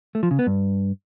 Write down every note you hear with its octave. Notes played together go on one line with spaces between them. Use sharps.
A3
F3
C#3
B3
G2